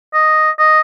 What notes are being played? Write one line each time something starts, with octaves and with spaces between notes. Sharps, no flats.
D#5
D#5